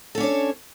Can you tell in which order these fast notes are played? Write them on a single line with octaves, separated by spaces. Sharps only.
A4 C#4 D4 C#5